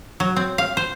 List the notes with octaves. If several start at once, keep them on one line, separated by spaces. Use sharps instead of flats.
F#3
C4
F5
C5